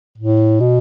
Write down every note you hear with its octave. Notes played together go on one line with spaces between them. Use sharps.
A2
B2